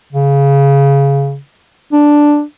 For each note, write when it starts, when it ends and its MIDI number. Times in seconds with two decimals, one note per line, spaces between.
0.12 1.37 49
1.92 2.43 62